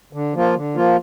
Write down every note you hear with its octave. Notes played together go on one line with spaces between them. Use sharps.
D3
F3 A#3 F4
D3
F3 A#3 F4